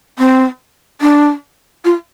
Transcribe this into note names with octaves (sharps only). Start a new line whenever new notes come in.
C4
D4
F4